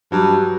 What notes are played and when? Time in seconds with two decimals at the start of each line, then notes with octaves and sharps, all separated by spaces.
0.12 G2 F#3